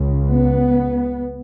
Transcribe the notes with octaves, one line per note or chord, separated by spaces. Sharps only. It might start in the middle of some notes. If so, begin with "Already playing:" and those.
Already playing: C#2 C#3
B3